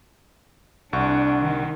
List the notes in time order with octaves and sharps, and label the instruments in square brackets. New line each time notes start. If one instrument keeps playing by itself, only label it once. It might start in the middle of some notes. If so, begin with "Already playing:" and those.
[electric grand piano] C2 F#5 C#6 [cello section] D4
[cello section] D#3